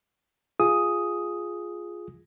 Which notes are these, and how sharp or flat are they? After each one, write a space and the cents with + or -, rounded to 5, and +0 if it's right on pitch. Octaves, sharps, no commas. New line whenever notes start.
F4 +0 G#4 +0 D#6 +5